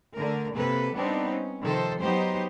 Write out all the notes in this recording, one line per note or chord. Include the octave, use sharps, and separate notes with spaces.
D3 A3 A#4
C3 A#3 A4 B4
G3 B3 C4 D4 D#4
C#4
C3 D#3 F3 A4 C5
F#3 B3 D#4 G4 C5